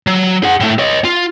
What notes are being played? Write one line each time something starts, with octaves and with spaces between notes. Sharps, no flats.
F#3
G#4 F#5
A2 A3
C#5 D#5
F4